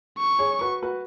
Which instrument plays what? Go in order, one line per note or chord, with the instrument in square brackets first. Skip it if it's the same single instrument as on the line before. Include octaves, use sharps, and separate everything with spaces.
[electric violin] C#6
[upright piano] G#4 C#5
F#4 B4
F#4 B4